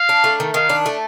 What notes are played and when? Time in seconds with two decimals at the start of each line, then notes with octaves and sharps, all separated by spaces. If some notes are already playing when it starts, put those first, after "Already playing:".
Already playing: F5
0.09 D4
0.24 A3
0.40 D#3
0.54 D#3 F5
0.69 D4
0.86 A3